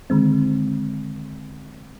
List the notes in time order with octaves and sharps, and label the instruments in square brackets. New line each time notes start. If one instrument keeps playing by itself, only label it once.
[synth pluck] D3 D#3 G#3 C4